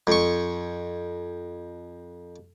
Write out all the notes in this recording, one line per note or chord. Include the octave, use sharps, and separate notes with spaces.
F2 C#6